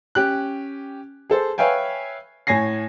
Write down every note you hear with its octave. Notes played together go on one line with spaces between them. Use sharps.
C#4 G4 F#6
G#4 A4 C5
B4 C#5 E5 F5 G5 G#5
A2 C#5 G#5 A#6 C7